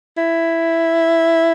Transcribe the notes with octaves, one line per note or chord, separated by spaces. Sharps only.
E4